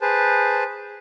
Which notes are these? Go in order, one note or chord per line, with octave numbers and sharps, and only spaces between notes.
G#4 B4 C5 A5